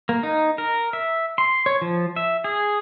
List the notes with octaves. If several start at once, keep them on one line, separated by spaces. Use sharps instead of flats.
A#3
D#4
A#4
E5
C6
C#5
F3
E5
G#4